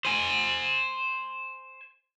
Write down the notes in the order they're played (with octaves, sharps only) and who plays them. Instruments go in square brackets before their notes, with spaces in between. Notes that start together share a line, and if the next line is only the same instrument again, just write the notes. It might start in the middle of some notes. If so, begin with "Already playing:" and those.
[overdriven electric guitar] C5 G#5